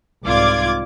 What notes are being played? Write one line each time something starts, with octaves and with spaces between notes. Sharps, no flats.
C2 G#2 F4 D5 D6 G#6